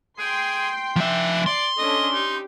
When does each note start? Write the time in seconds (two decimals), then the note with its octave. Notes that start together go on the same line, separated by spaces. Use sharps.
0.18 G#4 G5 C6
0.96 F3 D4 E5
1.46 D5 C6
1.78 C#4 D4 A4 D#5
2.14 D#4 G4